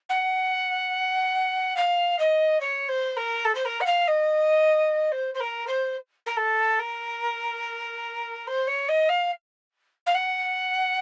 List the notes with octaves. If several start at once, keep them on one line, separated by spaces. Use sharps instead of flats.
F#5
F5
D#5
C#5
C5
A#4
A4
C5
A#4
F#5
F5
D#5
C5
C5
A#4
C5
A#4
A4
A#4
C5
C#5
D#5
F5
F5
F#5